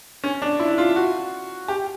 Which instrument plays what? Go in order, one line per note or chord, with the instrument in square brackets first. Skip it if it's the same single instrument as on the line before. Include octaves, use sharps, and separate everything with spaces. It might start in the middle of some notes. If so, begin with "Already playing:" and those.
[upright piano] C#4
D4
E4
F4
F#4
G4